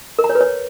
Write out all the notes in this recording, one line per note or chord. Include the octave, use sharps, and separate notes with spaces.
A#4
A#5
C#5
B4
C#5